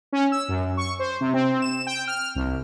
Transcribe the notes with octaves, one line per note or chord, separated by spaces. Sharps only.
C#4
E6
F#2
C#6
C5
C3
C4
E7
G5
F6
C2